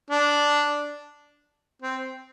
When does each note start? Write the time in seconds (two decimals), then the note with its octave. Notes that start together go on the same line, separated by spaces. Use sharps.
0.10 D4
1.82 C4